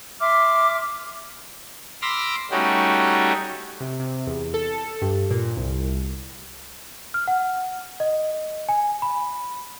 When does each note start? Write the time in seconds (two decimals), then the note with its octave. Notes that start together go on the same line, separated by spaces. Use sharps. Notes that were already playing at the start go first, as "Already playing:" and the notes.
0.21 E5 C6 D6 F6
2.02 B5 C6 D6 E6 F6 A#6
2.51 G3 A3 C#4 D#4 F#4 G4
3.80 C3
3.99 C3
4.27 E2
4.54 A4
5.02 G2
5.31 A#2
5.57 C2
7.14 F6
7.28 F#5
8.00 D#5
8.69 G#5
9.02 B5